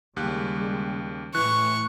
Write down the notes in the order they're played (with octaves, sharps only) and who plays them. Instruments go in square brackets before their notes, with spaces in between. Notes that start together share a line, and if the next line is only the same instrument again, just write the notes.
[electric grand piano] D#2 G4 F#6 [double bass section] C#3 G3 G#3
[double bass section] A2 [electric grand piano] E3 [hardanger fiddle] C#6 [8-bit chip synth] F#6